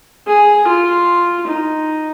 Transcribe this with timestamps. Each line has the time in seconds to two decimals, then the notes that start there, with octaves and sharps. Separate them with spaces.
0.27 G#4
0.67 F4
1.47 D#4